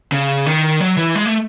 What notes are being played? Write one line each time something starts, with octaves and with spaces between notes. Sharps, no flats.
C#3
D#3
F#3
E3
G#3
A3